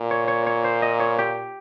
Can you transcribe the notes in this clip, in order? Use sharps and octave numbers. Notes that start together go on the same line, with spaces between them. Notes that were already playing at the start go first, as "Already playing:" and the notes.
Already playing: A#2
C#5
C#5
C#5
C5
D#5
C#5
G4